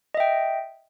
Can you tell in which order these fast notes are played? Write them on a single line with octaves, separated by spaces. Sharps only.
D#5 E5 G5